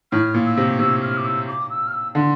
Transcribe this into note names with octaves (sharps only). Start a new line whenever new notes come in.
A2 F6
A#2
E6
C3
C3 E6
F6
D6
E6
D6
E6
F6
E6
D3 C6